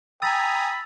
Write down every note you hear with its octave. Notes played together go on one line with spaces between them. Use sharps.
G5 G#5 A#5 B5 D#6 E6 A6 F7